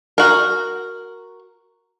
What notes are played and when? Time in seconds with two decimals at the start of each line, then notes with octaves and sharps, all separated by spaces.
0.18 F#4 A#4